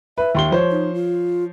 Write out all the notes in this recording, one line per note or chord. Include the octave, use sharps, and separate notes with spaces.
B4 E5
D#2 C6 G7
F3 C5 C#5
D#4
F4